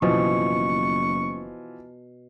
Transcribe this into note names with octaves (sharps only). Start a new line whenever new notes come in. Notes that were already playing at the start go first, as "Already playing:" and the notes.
F#1 B2 E3 F3 C#6